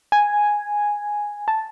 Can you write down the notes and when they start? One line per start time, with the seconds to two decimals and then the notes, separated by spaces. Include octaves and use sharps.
0.12 G#5
1.48 A5